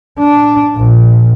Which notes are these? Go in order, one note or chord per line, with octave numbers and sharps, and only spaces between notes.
D4
A#1